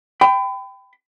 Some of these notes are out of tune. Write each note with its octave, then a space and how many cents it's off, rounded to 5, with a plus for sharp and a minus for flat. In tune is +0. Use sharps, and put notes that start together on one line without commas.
G5 +0 B5 +35